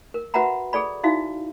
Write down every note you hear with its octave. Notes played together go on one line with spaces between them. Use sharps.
A#4
F#4 B4 E5 F#5 A#5 B5
G#4 A4 D5 B5
D#4 E4 F#4 E5 F5